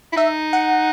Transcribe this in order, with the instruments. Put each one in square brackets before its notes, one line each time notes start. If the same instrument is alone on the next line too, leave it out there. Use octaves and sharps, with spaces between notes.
[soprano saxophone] E4
[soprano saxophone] D#4 [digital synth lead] E5
[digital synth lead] F#5